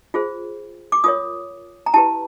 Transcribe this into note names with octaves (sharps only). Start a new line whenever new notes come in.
F4 G#4 C5
D6
F4 A#4 C#5 D#6
A#5
E4 G4 B4 A5